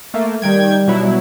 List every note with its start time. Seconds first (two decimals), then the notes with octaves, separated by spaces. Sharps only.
0.14 A3 A#3
0.42 D#3 G3 G5 G#6
0.87 B2 F#3 E4